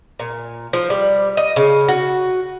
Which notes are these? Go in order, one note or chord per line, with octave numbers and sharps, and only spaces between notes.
A#2
F3
G3
D#5
C#3
F#4